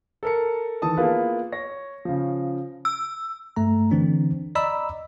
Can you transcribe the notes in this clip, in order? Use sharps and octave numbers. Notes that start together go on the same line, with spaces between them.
A4 A#4 C#7
D#3 E3 A4 A5 D#6
A#3 B3 E4 F4 G#4 B4
C#5 A#6
C#3 F3
E6
G2 A3 A#5
D3 E3 C4 D4
D5 D#5 A#5 B5 D6 E6